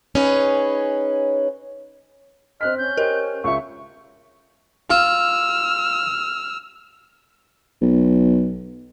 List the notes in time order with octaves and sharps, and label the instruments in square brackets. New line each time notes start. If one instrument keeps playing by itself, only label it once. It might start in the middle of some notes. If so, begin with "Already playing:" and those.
[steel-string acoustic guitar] C#4 D#4 G#4 B4 C#5
[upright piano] C4 F#6 B6 [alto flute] D#5 [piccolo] F6
[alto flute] C#4 [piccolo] G6
[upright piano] G4 C5 D#5 [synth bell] A#4
[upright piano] C#2 F4 E5 [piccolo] C#6
[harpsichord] F4 [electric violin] E6 F6
[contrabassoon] B1